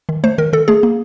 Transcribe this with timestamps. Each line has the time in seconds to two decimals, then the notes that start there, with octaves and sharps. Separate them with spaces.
0.09 D#3
0.24 A3 C5
0.38 D#3 A#4
0.53 D#3 A4
0.68 A3 G#4
0.83 A#3